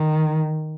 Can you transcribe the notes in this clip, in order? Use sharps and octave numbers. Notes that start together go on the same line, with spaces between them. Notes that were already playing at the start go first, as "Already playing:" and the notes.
Already playing: D#3